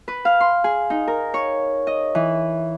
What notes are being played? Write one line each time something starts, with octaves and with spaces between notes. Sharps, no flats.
B4
F5
C6
G#4
D#4
A#4
C#5
D#5
E3